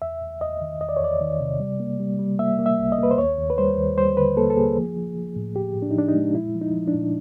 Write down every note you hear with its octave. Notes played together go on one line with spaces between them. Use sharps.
E2 E5
E2
E2 D#5
D#3
E2 D#5
D5
C#5
E2 D5
D#3
C3
G3
A#3
G3
G3
A#3 E5
A#3
E5
C2
D#5
A#3 B4
C5
D#2 C#5
D#2
B4
G3 C5
D#2
G3 C5
D3 B4
A#3 A4
A4
A#3 G#4
F3
F3
F3
A2
F3 G4
A2
D4
D#4
F3 D4
D#4
G#3
A#2 E4
F3
D#4
F3
D4
A#2